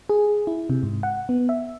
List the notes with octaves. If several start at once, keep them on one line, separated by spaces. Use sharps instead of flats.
G#4
E4
C3
G#2
F#5
B3
E5